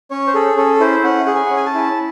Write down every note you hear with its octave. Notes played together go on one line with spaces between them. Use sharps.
C#4 C#5
C5
G#4 A4
C#4 A4
E4 C5
C#4 F#5
G#4 F#5
G#5
C#4 F#5
G#5
A5
E4